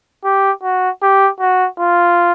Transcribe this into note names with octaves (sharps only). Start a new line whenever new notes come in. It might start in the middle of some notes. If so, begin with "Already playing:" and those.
G4
F#4
G4
F#4
F4